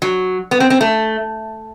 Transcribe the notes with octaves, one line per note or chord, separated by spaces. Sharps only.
F#3
B3
C4
C4
A3